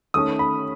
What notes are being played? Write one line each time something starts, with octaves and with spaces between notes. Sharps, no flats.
D#3 A3 C#4 D#6
B5